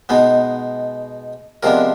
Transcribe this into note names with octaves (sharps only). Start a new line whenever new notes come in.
B2 G#3 B3 D#4
C3 F3 G#3 B3 D4 A#4